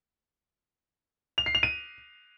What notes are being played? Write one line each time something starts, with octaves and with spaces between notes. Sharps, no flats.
F7
C7
F7
D#7